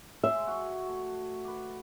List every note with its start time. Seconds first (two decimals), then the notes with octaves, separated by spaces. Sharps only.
0.24 G#3 E5 C6
0.47 F#4 C#5
0.89 A3
1.44 B4 D5